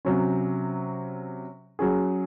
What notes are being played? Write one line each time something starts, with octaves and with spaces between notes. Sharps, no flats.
C3 F#3 C#4
F#3 C#4 G#4